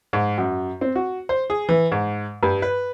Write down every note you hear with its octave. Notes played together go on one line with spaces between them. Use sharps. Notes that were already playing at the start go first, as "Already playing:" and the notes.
G#2
F#2
C4
F#4
C5
G#4
E3
G#2
G2
B4